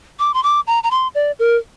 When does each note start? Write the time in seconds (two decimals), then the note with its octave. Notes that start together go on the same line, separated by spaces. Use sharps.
0.19 D6
0.34 C6
0.43 D6
0.67 A#5
0.83 A#5
0.91 C6
1.15 D5
1.39 A#4